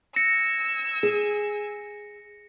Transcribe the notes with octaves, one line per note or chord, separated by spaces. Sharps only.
E6 G#6 A#6 C#7
G#4